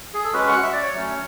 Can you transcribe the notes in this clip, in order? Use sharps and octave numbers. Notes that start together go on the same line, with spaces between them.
G#4
A4
G#3 C#4 F#4 B4
F#5
E5
D5
C#5
F#3 A3 C#4